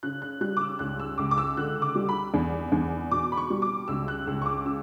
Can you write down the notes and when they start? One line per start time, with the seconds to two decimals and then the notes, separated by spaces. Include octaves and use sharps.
0.03 C#3 F#6
0.22 F#6
0.41 G3 F#6
0.57 D6
0.61 E6
0.79 C#2 F#6
1.00 E6
1.18 C#2 D6
1.31 D6
1.38 E6
1.57 D3 F#6
1.82 D6
1.95 G3
2.09 B5
2.34 E2
2.72 E2
3.11 B2 D6
3.32 B5
3.37 C#6
3.50 G3
3.62 D6
3.88 C#2 E6
4.08 F#6
4.27 C#2 E6
4.42 C#6
4.46 D6
4.65 C#3 E6